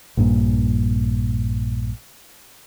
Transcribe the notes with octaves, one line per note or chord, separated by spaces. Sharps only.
A#1 G2 A#2